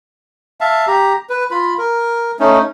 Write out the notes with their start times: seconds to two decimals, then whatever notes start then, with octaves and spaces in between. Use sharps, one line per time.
0.61 E5 F5 A5
0.87 G4 A#5
1.30 B4
1.51 F4 B5
1.78 A#4
2.40 A3 C#4 D#4